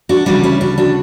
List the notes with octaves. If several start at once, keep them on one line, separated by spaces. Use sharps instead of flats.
D4 F#4
D2 C#3 E3 G3 D4 F#4
C#4 E4
D4 F#4
D4 F#4